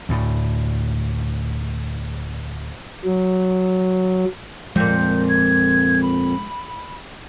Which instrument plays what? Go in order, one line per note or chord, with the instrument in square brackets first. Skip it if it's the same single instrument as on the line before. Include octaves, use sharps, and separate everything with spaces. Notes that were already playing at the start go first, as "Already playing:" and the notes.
[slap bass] D2 A2
[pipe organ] F#3
[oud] F2 A#2 [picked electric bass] F3 G#3 [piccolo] G6
[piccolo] G#6
B5